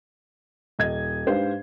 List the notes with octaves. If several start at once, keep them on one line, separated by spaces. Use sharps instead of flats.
D#1 D#5 G#6
G#2 D4 G4 B4 C5 F5